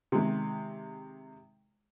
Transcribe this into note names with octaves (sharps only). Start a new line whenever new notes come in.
C3 D#3 G#3